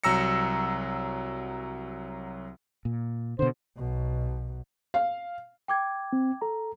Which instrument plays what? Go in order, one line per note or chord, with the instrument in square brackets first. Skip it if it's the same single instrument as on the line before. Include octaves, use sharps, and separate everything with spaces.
[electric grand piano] C2 F#3 A#5 E6 A#6 C#7
[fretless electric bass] A#2
[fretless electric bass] B2 D3 [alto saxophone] C5
[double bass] B1 B2
[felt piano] F5
[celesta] G5 D6 G#6
[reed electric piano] C4
A4 A#5